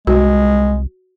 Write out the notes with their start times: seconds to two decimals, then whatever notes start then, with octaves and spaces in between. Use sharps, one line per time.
0.07 C2 G#3 F#4